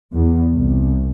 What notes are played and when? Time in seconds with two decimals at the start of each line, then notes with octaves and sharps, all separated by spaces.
0.14 E2
0.51 C2